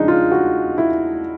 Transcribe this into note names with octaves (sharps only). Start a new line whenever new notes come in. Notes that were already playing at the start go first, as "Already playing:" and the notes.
Already playing: C#3 F3 G#3 D4 D#4
F4
F#4
E4